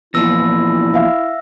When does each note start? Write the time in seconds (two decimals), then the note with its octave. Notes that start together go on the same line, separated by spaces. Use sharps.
0.14 E2 A#2 F3 E4 E6 A#6
0.94 E5 F5